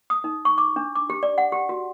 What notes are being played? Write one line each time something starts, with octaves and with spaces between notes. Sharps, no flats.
D#6
D#4
C#6
D6
D4
D6
G4
D5
F#5
G4
F#4